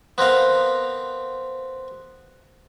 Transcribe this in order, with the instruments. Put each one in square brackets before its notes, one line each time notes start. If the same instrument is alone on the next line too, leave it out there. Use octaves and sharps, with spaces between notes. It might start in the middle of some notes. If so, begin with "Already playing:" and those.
[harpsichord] B3 C4 A#4 F5